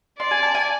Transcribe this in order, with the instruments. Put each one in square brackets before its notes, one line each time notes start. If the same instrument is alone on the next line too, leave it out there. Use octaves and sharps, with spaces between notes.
[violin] D5 [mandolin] C6
[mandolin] G#5
A5
G#5